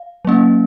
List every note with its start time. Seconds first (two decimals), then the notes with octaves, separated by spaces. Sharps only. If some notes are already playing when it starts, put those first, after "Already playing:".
Already playing: F5
0.25 F#3 A#3 C#4